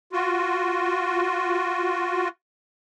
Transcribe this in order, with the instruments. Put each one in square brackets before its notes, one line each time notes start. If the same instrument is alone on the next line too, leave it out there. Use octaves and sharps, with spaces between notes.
[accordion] F4 F#4